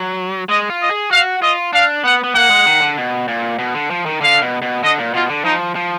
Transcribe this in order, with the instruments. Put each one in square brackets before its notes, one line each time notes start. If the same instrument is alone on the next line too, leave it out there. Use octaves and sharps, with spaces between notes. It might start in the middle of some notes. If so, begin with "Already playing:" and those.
Already playing: [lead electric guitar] F#3
[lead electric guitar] G#3 [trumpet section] D#5
[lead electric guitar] F4
[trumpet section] D#5
[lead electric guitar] G#4
[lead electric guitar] F#4 [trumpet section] F5
[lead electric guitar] F4 [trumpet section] D#5
[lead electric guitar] D4 [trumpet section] F5
[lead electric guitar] B3 [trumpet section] F#5
[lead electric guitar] B3
[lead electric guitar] A#3 [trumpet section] F#5
[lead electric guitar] G#3
D#3
D3
B2
A#2
B2
D3
F3
D#3
[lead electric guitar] D3 [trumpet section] F5
[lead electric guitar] B2
B2
[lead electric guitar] D3 [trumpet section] D#5
[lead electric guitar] A#2
[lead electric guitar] B2 [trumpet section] F4
[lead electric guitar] D3
[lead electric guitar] F3 [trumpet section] D#4
[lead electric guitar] F3